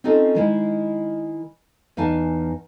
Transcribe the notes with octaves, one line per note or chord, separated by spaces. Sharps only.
C4 C#4 D#4 F4 A4
D#3 G#3 E4
E2 D#4 F5 G#5 A5